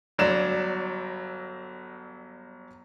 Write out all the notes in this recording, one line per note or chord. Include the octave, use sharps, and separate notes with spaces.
G1 F#3 D5 E7